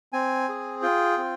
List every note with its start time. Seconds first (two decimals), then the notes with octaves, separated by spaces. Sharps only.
0.13 C4 G#5
0.49 G#4
0.82 F4 G5
1.17 C4